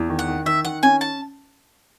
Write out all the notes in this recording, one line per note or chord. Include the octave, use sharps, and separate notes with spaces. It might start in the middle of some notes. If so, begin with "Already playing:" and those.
Already playing: E2
D#3
F#5
D#3
D#3 E5
D#3 F#5
C#4 G#5
A5